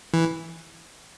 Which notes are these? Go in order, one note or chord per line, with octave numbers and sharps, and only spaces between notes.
E3